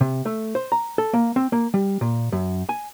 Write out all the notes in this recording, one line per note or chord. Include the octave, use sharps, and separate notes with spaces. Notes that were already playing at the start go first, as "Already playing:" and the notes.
C3
A3
C5
A#5
A4
A#3
C4
A#3
G3
A#2
F#2
G#5